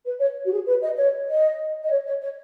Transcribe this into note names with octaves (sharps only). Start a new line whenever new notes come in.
B4
C#5
F#4
G#4
B4
D#5
C#5
D#5
D#5
C#5
C#5
C#5